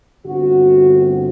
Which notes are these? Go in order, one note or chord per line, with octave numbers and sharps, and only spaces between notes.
G1 G2 D3 A3 C4 F#4